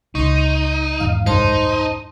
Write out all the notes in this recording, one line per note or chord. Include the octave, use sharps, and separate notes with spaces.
C#2 C#3 D#4 C6 C#6
E2 G#2 D#3 F5
C2 F#2 G#3 D#4 C5 A5 C6